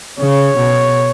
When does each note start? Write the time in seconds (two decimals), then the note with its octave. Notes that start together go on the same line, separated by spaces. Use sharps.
0.19 C#3 C#5
0.58 B2